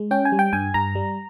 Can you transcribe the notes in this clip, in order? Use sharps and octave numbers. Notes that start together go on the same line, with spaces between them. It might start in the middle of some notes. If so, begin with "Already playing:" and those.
Already playing: G#3
C#4 G5
G#5
G3
G5
G2 G#5
G2 A#5
G3